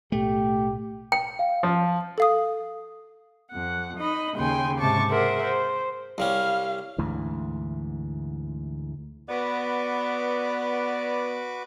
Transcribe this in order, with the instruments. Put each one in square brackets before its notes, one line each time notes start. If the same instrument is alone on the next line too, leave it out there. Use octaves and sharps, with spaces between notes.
[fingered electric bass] B1 A2 [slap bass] A3 [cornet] G4
[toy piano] G5
[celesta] F5
[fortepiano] F3
[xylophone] A4 F5 D#6
[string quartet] F2 F#5
D#4 D#5 B5
D#2 C#3 G5 G#5 C6
G#2 C3 A5 C#6 D6
G#4 A#4 C5 E5 F#5
C5
[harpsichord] C2 G3 C#4 [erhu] F5
[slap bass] D2 G#2 E3
[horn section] B3 [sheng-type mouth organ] F#4 B4 D6 [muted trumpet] D5